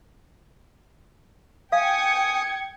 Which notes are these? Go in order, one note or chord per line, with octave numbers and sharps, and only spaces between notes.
F5 G5 G#5 D#6 G#6 C#7